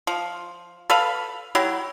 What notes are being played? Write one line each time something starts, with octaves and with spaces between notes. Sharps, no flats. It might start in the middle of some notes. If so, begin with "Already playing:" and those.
F3
A4 B4 F5 B5
F#3 E4 G4